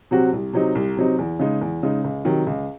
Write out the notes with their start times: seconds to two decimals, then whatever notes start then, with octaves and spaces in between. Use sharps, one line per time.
0.11 C3 F#3 C4 F#4
0.33 C2
0.53 C3 F#3 C4 D#4
0.75 C2
0.97 C3 F#3 C4 D#4
1.19 E2
1.39 C#3 G#3 D#4
1.61 E2
1.83 C#3 G#3 D#4
2.04 C#2
2.25 C3 D#3 F#3
2.47 C#2